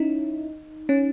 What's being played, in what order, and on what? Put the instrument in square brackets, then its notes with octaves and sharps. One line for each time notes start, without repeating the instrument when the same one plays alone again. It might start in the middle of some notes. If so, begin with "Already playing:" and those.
Already playing: [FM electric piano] C#4 D#4 E4
C#4